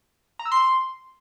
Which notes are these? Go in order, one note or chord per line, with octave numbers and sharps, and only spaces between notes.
A#5
E6
C6